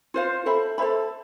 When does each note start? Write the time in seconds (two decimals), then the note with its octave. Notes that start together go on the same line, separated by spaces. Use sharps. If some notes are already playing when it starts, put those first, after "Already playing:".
0.14 F4 C5 F5
0.46 A4 C5 E5 B5
0.78 A4 C5 E5 B5